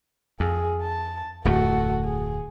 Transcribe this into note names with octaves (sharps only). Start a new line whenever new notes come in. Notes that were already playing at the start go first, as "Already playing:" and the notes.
F2 G#4
A5
D1 F2 A3 F#4 A4
G#4